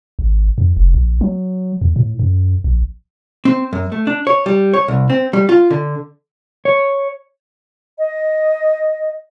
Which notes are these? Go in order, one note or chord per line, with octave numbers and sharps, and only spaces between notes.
G#1
F2
F1
A#1
F#3
E2
A2
F#2
A#1
C4
F#2
A3
D4
C#5
G3
C#5
C2
C4
G3
F4
D3
C#5
D#5